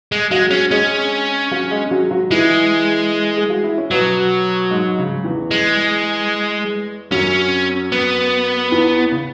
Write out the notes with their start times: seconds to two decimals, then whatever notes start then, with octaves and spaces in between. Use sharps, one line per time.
0.12 G#3
0.31 F#3 G#3 F#4
0.51 C#4
0.71 G#3 C#4 G#4
1.51 F#3 F#4
1.71 G#3 G#4
1.91 F#3 F#4
2.11 F#3 F#4
2.31 E3 G#3 E4
3.37 G#4
3.50 F#4
3.64 E4
3.78 C#4
3.91 B2 F#3 B3
4.71 G#2 G#3
4.98 C#3
5.24 E2 E3
5.51 G#3
7.11 F#2 F#3 C#4
7.92 B3
8.72 E2 E3
9.11 C#3